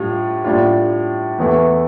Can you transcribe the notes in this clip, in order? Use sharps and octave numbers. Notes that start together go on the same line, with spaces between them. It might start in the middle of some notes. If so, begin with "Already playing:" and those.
Already playing: A2 G3 D4 F4
A2 G3 D4 F4
E2 E3 A3 E4